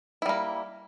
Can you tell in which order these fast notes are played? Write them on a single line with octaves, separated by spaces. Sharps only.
E4 G3 A#3